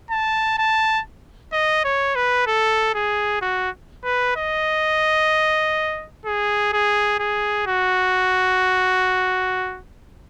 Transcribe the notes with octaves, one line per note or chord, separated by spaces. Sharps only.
A5
A5
D#5
C#5
B4
A4
G#4
F#4
B4
D#5
G#4
G#4
G#4
F#4